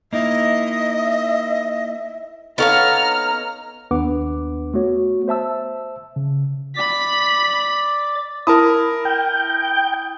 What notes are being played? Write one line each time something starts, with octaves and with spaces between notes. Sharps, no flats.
A#3 D#4 E4 D#5 E5
B3 D#4 A4 C#5 F5 A#5 F6
D#2 B3 D4 B4 F#5 D6
A3 B3 F#4 C#5
C5 E5 A5 E6
C#3
D5 B5 D6 B6
E4 A#4 A5 D#6
G5